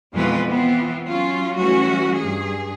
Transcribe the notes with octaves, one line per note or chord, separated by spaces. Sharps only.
F2 B2 E3 G#3 F4 B4
E3 B3 C4 F4
F#3 C#4 F4
E3 F#3 G3 A3 C#4 F#4
G2 G#4